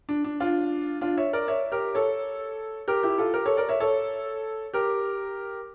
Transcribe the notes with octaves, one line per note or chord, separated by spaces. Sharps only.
D4
D4
D4 F4
D4 F4
C#5 E5
A#4 D5
C#5 E5
G4 A#4
A4 C#5
G4 A#4
E4 G4
F4 A4
G4 A#4
A4 C#5
A#4 D5
C#5 E5
A4 C#5
G4 A#4